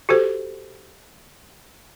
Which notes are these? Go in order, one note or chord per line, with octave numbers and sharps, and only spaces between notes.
F#4 G4 A4 C5